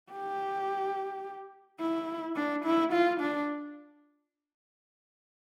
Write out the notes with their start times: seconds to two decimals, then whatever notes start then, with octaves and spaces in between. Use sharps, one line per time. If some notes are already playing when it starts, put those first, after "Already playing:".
0.12 G4
1.80 E4
2.36 D4
2.65 E4
2.93 F4
3.21 D4